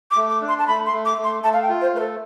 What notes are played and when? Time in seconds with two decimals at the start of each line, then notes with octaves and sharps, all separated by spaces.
0.11 D6
0.16 A3
0.29 D6
0.41 D4
0.48 C6
0.59 A5
0.67 A3 B5
0.86 C6
0.92 A3
1.05 D6
1.18 A3
1.24 C6
1.43 A3 A5
1.53 F5
1.62 G5
1.69 F4
1.81 C5
1.94 A3 B4
2.00 A4